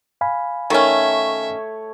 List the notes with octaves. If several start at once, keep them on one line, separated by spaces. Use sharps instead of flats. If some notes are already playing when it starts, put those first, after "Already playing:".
F5 G#5 B5
D#3 A3 C#4 C#5 E5